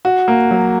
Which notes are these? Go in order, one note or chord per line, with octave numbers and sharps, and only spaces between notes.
F#4
A#3
F#3